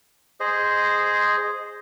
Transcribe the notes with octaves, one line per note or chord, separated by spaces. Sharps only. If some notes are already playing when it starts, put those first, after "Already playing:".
G#4 C5 D#5